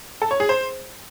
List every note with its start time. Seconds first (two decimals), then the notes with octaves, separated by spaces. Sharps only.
0.22 A4
0.31 C#5
0.40 G#4
0.49 C5